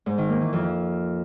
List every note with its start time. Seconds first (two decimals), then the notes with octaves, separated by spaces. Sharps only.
0.06 G#2
0.18 D#3
0.29 A#3
0.41 E3
0.53 F2